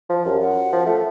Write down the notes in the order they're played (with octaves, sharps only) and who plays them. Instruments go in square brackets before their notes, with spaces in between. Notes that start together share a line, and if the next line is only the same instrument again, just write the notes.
[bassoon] F3
[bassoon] F#2 [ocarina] G4
[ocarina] F#5
[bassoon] F3
[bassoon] A3 [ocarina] F4